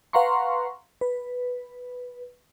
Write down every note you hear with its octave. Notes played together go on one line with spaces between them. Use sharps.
B4 F5 F#5 A#5 C6 C#6
B4